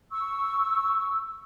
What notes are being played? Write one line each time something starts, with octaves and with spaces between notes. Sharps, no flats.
C#6 E6